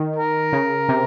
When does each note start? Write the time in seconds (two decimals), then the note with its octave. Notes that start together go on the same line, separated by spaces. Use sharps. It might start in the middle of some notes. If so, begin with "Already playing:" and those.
Already playing: D#3
0.16 A#4
0.53 C#3
0.89 C3